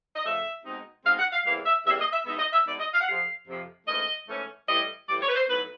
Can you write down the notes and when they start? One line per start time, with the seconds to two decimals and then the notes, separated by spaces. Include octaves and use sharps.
0.16 D#5
0.25 C#3 F3 A3 E5
0.64 B2 G#3 C4 D#4
1.05 B2 G#3 C4 D#4 F5
1.19 F#5
1.32 F5
1.45 E2 C3 E3 G3 A#3 F5
1.65 E5
1.85 E2 C3 E3 G3 A#3 E5
1.99 D#5
2.13 E5
2.26 B2 G#3 B3 D#4 E5
2.39 D#5
2.53 E5
2.66 B2 G#3 B3 D#4 D5
2.79 D#5
2.93 F5
3.01 F#5
3.07 F2 C3 F3 F5
3.47 F2 C3 F3
3.87 G#2 E3 A3 C#4 D#5
4.28 G#2 E3 A3 C#4
4.68 A2 E3 G3 D#5
5.09 A2 E3 G3 D5
5.22 C#5
5.29 B4
5.35 C5
5.49 A2 F#3 B3 D#4 B4